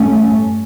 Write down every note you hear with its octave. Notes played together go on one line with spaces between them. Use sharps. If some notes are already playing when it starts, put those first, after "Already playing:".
Already playing: G2 A3 C#4